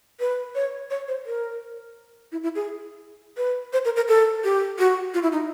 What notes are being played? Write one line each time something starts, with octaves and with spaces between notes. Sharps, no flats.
B4
C#5
C#5
C5
A#4
E4
E4
G#4
B4
C5
A#4
A#4
A4
G4
F#4
F4
E4
D#4